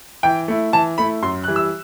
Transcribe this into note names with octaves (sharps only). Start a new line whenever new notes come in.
E3 G5
A3 E4
E3 A5
A3 E4 B5
F#2 C6
E3 G3 F#6
E6